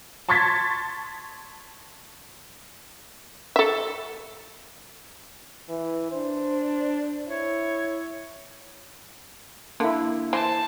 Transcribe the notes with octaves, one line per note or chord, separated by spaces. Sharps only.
A5 C6 C#6 G#6 A6 B6
A4 E5
E3
D4 C5
E4 C#5
D3 A#3 E4
E3 C5 A5